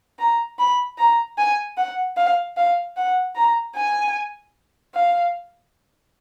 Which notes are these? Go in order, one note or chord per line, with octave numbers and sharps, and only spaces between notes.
A#5
B5
A#5
G#5
F#5
F5
F5
F#5
A#5
G#5
F5